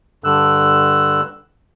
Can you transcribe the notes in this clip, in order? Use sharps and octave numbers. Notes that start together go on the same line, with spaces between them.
G2 D3 E6 F#6